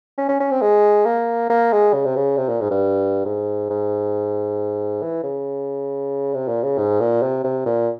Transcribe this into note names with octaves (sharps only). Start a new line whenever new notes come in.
C#4
C#4
C#4
C4
G#3
A#3
A#3
G#3
C#3
C3
C#3
C3
A#2
G#2
G2
G#2
G#2
E3
C#3
C3
A#2
C#3
G#2
A#2
C3
C3
A#2